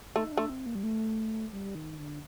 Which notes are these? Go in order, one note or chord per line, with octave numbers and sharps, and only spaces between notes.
A3 D#4
D4
A3
C4
A#3
G3
A3
G3
D#3
D3